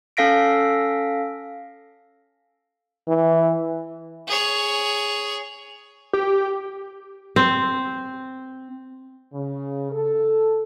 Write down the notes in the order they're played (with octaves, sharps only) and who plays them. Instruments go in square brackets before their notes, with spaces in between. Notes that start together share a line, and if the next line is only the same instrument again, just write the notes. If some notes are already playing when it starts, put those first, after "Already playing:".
[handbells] C#4 A4 F5 A#6 B6 D7
[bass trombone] E3
[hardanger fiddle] G#4 C#5
[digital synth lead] G4
[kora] C4
[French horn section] C#3
A4